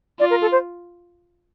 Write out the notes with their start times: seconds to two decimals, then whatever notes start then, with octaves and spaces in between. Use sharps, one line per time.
0.20 F4 D5
0.30 A#4
0.41 A4
0.52 C5